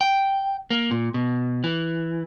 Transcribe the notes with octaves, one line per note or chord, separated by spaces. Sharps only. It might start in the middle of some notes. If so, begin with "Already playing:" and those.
G5
A#3
A#2
B2
E3